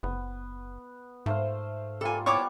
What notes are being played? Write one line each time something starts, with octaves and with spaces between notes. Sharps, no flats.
F#1 B3
G#2 A3 C5 F5
G3 A#3 F4 A4 G#5
G3 B3 E4 C#5 D5 A5 C#6 D6